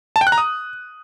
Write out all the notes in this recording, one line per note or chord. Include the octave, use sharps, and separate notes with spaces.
A5
G5
F#6
A#5
D#6